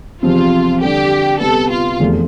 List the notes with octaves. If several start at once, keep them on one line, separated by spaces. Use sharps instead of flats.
E2 C3 F3 C4 F4
D3 G3 D4 G4 A4
C3 G3 B3 A4
F4
F1 E2 C3 F3 A3